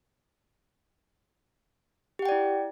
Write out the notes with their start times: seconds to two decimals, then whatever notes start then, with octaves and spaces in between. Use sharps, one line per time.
2.19 G4
2.22 F#5
2.25 G5
2.29 D5
2.32 E4